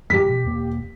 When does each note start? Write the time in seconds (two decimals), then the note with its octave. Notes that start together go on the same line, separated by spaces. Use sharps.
0.10 G#2 F3 G3 G4 B6
0.26 B2
0.44 E1 A#3